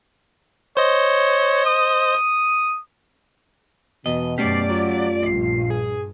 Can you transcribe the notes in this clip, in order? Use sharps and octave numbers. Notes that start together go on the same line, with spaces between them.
C5 C#5 D#5
D#6
E2 B2 D#5
F#2 A3 C#4 G4 D5 C7
F#3 F4
A#1 G2 C7
G#4